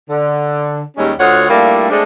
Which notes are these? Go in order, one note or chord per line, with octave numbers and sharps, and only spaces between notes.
D3
D#2 G3 G#3 C#4
D2 F4 C#5 D#5 F#5
G3 A3 A#3 D4 E4 F4
G#3 A3 C4 D4